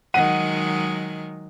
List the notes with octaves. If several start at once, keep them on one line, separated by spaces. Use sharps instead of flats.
D#3 F#3 G#3 F#5 D#7